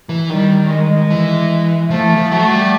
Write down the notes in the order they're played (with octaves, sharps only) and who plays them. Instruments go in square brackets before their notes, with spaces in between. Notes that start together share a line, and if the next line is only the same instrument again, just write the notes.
[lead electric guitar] E3
[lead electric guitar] D#3 [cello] G3
[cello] G#3
[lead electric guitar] E3
[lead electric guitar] F3 [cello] A3
[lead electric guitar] E3
F3
[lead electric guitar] F#3 [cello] A3
[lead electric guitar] G3